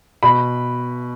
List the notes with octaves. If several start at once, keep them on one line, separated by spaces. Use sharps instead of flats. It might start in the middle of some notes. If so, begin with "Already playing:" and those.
B2 B5